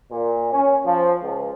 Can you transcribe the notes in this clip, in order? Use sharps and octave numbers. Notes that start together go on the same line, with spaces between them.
A#2
C#4
F3
C#2